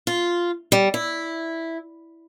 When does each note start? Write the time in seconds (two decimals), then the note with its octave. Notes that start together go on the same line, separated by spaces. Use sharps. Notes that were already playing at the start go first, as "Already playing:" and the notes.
0.07 F4
0.72 G3
0.94 E4